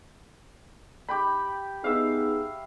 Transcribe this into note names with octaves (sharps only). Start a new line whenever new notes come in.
G4 G5 B5
B3 D#4 G#4 E5 F5